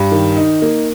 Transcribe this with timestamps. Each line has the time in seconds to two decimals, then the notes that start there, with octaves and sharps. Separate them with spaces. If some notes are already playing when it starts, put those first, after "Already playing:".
Already playing: G2
0.12 D#3
0.37 D#4
0.62 A#3